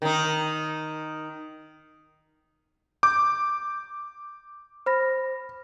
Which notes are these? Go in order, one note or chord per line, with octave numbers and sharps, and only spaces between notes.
D#3 D#4
D6 G6
C5 B5 A#6